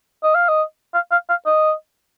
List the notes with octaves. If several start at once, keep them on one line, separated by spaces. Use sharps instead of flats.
D#5
F5
D#5
F5
F5
F5
D#5